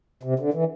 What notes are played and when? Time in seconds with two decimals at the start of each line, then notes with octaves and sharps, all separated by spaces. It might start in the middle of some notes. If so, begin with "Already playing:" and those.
0.23 C3
0.39 D3
0.54 E3